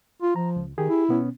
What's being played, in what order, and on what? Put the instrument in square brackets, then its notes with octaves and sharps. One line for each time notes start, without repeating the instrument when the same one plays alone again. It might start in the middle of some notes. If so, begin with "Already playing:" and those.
[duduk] F4
[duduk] F3 [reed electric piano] A#5
[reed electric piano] C#2
[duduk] D#3 [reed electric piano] G4 G#4
[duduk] E4
[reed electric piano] B2 B3 C#4